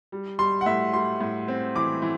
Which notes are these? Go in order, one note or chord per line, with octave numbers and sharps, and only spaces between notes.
G3
G3 C6
F#5
A2 E5
G3 C6
A2
C4
E3 D6
E3